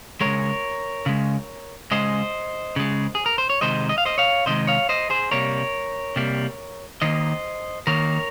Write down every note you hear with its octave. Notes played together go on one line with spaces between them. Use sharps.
C#3 G#3 A#4 C#5
C#3 G#3
C#3 G#3 C5 D#5
C#3 G#3
G#4
A#4
C5
C#5
C3 D#3 G#3 C5 D#5
D#5
F5
C5 D#5
C#5 F5
C3 D#3 G#3 C5 D#5
C#5 F5
C5 D#5
G#4 C5
C3 G3 A#3 A#4 C#5
C3 G3 A#3
D#3 A#3 C5 D#5
D#3 A#3 A#4 C#5